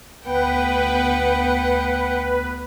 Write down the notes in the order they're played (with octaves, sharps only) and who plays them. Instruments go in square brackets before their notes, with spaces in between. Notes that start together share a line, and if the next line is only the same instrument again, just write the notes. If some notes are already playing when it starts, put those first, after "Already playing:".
[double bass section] D2 B3 [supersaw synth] B4 [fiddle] F#5 G5